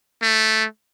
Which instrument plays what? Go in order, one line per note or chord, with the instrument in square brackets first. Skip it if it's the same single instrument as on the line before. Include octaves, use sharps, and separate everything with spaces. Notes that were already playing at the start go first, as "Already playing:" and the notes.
[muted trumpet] A3